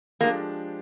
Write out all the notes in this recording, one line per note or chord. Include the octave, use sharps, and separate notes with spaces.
F3 G#3 A#3 D4 G4